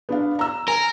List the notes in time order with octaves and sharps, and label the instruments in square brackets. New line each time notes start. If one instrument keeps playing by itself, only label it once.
[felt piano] B3 D4 F5
A#5 E6
[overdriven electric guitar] A#4 [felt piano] G#5